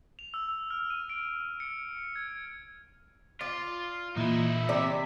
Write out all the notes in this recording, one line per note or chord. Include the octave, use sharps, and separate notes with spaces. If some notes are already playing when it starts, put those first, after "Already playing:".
F7
E6
F6
D#7
D7
C#7
G#6
F4 D5
A#2 E3 D#4 E4
C3 D5 B6